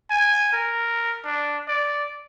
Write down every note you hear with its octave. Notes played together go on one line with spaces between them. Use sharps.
G#5
A#4
D4
D5